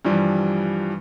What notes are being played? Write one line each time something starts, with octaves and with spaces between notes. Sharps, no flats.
G2 E3 F3 G3